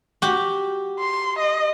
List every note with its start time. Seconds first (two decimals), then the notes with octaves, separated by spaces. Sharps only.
0.22 F#4 G4
1.00 C6
1.39 D#5